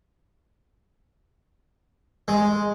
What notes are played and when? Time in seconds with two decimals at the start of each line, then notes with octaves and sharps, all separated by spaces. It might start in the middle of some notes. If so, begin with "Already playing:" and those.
2.28 G#3